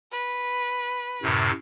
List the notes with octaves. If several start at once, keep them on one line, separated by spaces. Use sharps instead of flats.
B4
F#2 A2 C3